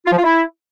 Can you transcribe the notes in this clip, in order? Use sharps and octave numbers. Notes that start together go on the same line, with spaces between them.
F4
F3
F4
E4